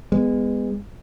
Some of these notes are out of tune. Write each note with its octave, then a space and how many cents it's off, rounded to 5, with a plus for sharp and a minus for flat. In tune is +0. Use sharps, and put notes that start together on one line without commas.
G#3 -25 B3 +10